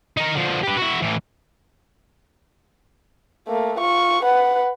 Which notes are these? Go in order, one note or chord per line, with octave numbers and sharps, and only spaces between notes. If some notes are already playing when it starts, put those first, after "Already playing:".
D#4 A#4
D3 F3
G4 B4
E4 F#4
A2 E3
A3 A#3
F4 C#6
B4 F#5